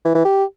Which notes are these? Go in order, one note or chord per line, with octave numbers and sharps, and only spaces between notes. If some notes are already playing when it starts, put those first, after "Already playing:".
E3
E3
G4